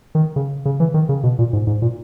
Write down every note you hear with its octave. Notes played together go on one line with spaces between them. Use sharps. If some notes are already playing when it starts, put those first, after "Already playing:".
D#3
C#3
C#3
E3
D#3
C#3
B2
A#2
G#2
G#2
A#2